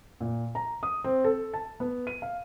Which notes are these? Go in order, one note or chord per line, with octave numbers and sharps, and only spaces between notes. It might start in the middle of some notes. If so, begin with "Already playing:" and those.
A#2
A#5
D#6
C4
A4
A5
B3
D#7
F5